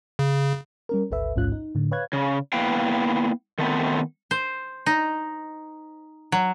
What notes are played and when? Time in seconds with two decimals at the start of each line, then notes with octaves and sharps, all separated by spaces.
0.19 C#3
0.89 G3 C#4 A#4
1.11 G#1 D2 A4 B4 E5
1.36 A1 D2 G#2 C#4 F4 F#6
1.52 D#4
1.75 A2 D3
1.91 B4 C#5 F5 F#6 G#6
2.13 C#3
2.53 A#3 B3 E4 B4 F5 G5
3.58 D#3 A3 B3 C4
4.31 C5
4.86 D#4
6.32 F#3